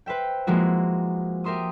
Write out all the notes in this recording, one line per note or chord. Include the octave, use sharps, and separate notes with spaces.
B4 C5 E5 G5
F3 G#3 A#3 E4 F#4
G4 A#4 E5 C6 D#6